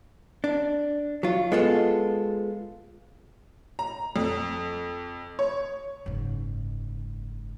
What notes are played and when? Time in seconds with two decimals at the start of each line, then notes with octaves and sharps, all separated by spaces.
0.44 D4
1.23 F#3 F4
1.52 G#3 B3 F4 A4
3.79 A#5
4.16 F2
5.39 C#5
6.06 F#1 G#2